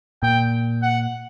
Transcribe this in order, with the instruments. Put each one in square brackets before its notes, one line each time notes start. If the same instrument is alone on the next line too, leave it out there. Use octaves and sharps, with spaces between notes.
[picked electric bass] A#2 [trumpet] G5
[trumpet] F#5